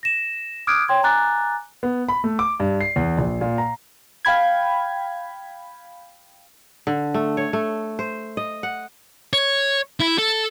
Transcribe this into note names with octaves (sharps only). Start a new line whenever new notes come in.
A#6 E7
D6 D#6 F6 F#6 G#6 D7
C#5 G5 C6 G#6
G#5 A#5 D6 F#6 A6
B3
B5
A3
D6
G2
C7
E2
A#1
A#2
A#5
F5 G5 B5 G#6
D3
A3
C#5
A3
C5
D#5
F#5
C#5
E4
A4